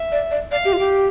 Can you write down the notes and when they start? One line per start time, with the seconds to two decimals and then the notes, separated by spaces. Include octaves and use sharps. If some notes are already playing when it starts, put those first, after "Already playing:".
Already playing: E5
0.12 D5
0.31 D5
0.51 D5 F5
0.65 G4
0.73 F4
0.79 G4